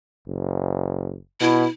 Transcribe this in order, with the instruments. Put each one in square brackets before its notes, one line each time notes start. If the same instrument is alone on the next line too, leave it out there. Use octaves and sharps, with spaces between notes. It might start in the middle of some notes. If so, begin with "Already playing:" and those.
[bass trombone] F#1
[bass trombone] B2 [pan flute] E4